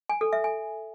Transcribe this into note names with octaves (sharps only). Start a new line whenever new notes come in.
G#5
A4
E5
G#5